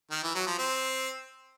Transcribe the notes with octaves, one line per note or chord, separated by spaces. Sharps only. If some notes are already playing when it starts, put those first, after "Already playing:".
D#3
E3
F#3
F3
C4